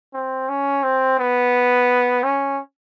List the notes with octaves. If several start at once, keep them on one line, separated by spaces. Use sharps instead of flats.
C4
C#4
C4
B3
C#4